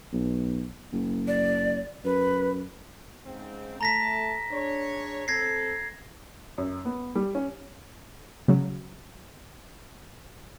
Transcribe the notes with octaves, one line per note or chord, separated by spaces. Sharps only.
B1
F#1
D5
F#2 B4
G#2 C#3 C4
A3 A5 A#5 A#6 B6
D4 G#4 C#5
C4 A4 G#6 A#6 C7
F#2
B3
G3
C#4
C#3 F#3